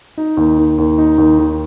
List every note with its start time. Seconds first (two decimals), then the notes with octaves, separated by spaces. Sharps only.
0.17 D#4
0.37 D#2
0.57 D#3
0.78 D#2
0.98 D#4
1.18 D#2
1.38 D#3